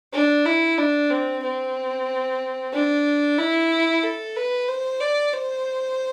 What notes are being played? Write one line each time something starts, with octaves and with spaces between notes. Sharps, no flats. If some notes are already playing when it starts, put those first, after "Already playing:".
D4
E4
D4
C4
C4
D4
E4
A4
B4
C5
D5
C5